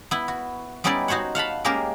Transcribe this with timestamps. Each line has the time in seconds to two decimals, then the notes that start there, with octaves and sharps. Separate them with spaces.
0.11 B3 E4
0.28 F#4
0.84 G3 B3 C#4 D#4 E4 D5
1.08 D#4 F#4 C5 C#5 F#5
1.35 F5 F#5 A5 B5
1.65 G#3 A#3 C#4 G4 A#4